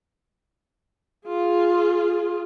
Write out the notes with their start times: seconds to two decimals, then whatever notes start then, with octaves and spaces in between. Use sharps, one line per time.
1.28 F4 G#4